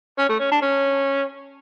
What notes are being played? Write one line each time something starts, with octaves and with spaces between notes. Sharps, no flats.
C#4
A3
C#4
D4
C#4